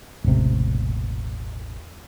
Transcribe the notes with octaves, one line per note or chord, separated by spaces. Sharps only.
E1 A1 C3